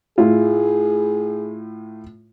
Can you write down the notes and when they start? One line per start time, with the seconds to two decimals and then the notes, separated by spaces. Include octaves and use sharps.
0.18 A2 E4 F4 G#4